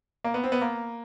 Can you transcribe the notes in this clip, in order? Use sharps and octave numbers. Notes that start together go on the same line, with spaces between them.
A#3
B3
C4
B3
A#3